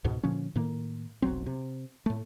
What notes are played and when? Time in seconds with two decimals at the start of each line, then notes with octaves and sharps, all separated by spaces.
0.04 C#2 G#2 B2
0.23 A#2 D3 F3 C#4
0.56 A2 D#3 A#3
1.22 F1 B1 F#3 C4
1.46 C3
2.06 A2 A3